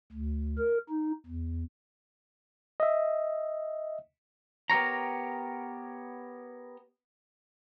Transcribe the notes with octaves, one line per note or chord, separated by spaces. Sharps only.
D2
A#4
D#4
E2
D#5 E5
B3 G4 A#4 C#5 A#5